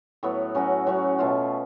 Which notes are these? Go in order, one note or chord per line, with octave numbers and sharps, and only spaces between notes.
A2 F#3 B3
F#3 C#4 F#4
F#3 C#4 F#4
B2 A3 F4